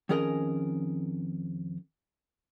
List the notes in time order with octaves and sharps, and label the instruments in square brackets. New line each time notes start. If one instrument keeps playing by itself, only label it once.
[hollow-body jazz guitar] F2 D#3 C#4 G#4 A#4 D#5